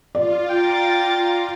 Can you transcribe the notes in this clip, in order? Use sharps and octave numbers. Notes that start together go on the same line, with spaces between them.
F4 D5
G5 A#5 D6 A6